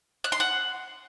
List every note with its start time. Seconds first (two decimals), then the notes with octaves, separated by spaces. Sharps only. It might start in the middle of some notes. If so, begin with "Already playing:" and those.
0.24 F#6
0.32 C6
0.40 F#5